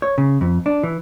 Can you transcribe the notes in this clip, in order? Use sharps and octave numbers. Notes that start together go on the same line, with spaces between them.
C#5
C#3
F2
D4
E3